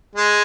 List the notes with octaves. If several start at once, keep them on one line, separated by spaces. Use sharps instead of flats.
G#3